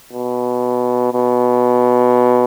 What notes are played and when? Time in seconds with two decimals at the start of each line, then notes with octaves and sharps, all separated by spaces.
0.12 B2
1.13 B2